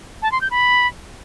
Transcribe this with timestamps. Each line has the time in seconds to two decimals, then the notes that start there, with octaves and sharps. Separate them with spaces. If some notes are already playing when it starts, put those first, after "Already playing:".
0.22 A5
0.32 C6
0.41 G6
0.51 B5